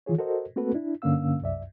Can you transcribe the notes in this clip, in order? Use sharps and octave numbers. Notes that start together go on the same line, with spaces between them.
D#3 E3 F4 G#4 C#5
F#4 A4 A#4 C5 D#5
A3 A#3 C4 F#4 A4 B4
D4 E4
G2 D3 A#3 C#4 F5 E6
C2 F#2 D5 E5